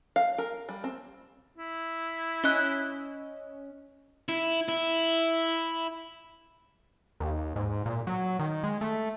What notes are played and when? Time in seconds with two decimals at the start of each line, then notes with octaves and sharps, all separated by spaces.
0.16 F5
0.38 A#4
0.69 G3
0.84 C4
1.58 E4
2.44 C#4 D#5 F#6
4.29 E4
4.68 E4
7.20 D#2
7.56 G#2
7.86 A#2
8.07 F#3
8.39 D#3
8.63 G#3
8.81 A3